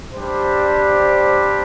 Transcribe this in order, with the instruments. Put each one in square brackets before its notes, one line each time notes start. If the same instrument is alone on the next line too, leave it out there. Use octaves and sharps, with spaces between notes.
[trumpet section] G3 D4 G4 C5